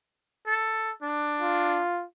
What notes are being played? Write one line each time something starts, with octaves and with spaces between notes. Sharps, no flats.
A4
D4
F4